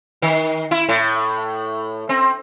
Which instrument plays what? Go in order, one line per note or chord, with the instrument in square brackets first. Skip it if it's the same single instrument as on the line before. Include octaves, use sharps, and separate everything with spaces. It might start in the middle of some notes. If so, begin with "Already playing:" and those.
[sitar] D#3
E4
A2
C4